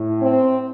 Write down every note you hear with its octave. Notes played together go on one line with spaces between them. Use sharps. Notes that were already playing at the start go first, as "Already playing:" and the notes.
Already playing: A2
C4